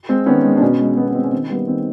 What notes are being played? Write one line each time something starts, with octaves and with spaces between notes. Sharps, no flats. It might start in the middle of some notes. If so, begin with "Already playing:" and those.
G#3 C4
D#3 B3 C#4
G#3
D4
B2 B3 C#4
G#3
B2 B3
B3
G#3 C4
C#4
D#3 C4
G3 A#3 B3
D#3 C4